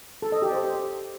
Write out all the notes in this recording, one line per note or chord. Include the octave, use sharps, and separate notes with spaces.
A4
D#5
G4
C5